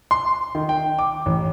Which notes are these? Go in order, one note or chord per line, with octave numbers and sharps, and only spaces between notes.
C6
D#3
G5
D6
A1